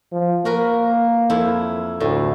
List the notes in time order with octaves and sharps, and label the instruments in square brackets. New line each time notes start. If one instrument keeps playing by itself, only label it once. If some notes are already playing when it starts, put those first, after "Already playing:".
[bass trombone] F3
[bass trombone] A#3 [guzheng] F#4 A#4 B4
[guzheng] F2 E4
[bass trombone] D2 [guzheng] A2